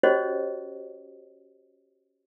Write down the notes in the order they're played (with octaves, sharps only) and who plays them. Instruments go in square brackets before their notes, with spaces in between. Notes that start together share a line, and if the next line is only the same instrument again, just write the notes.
[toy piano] C#4 F#4 G4 C5 C#5 D#5